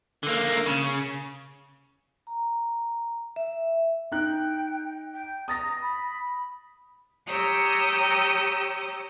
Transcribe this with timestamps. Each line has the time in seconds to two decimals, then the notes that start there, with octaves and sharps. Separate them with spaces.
0.23 D3 A#3
0.66 C#3
2.27 A#5
3.36 E5
4.12 D#4 G5 F#6
5.13 G5
5.48 A#5 D#6 A6 A#6
5.82 B5
7.26 G4 C#5 A#5 D#6 E6 G6